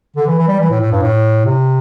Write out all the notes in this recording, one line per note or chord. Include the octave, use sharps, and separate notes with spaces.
D3
E3
E3
G3
E3
A2
A2
G2
A2
C3